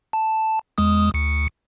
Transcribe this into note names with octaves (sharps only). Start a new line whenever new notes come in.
A5
E2 G#3 D#6
D2 C#7